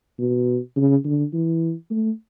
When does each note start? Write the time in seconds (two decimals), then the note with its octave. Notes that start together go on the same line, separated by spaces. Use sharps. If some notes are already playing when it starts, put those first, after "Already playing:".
0.19 B2
0.76 C#3
1.04 D3
1.33 E3
1.90 A3